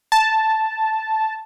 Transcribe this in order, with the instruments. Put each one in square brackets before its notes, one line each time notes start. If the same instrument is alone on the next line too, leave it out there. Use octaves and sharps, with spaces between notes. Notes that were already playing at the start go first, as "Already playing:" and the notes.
[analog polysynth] A5